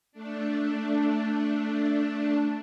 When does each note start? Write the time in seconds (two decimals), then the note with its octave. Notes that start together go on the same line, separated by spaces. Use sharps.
0.12 A3 D4